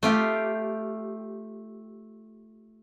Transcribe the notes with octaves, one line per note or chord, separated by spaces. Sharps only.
A3 F4 G4